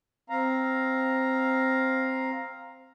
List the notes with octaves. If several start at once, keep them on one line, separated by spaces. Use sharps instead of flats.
C4 F5 A#5